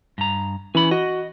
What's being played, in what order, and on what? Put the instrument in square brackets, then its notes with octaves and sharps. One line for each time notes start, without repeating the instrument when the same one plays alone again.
[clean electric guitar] G2 A#5
[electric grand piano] E3 [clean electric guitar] C#4 B5
[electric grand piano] F#4 [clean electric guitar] D#5